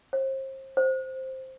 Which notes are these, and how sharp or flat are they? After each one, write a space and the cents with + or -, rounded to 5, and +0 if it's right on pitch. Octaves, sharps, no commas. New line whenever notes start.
C5 +35
C5 +5